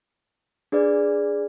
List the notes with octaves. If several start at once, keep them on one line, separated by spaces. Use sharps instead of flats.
D4 G#4 B4 D5